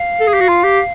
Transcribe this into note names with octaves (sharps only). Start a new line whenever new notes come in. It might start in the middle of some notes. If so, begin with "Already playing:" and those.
Already playing: F5
A4
G#4
G4
F#4
F4
G4